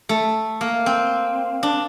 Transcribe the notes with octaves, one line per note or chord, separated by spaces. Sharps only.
A3
A#3
C4
D4